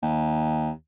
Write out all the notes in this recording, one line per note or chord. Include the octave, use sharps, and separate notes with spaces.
D#2